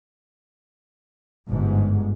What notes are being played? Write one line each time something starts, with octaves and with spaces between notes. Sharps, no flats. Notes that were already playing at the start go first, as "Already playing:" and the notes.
G1 G#2